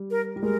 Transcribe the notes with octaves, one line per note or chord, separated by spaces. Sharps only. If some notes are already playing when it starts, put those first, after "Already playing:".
Already playing: G3
A#4
G3
G#3 A#4